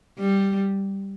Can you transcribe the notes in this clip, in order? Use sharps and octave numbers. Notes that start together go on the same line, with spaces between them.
G3